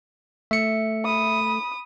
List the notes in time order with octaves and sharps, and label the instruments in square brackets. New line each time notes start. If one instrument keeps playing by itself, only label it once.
[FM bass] A3 [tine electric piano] E5 C#7
[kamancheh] B5 D#6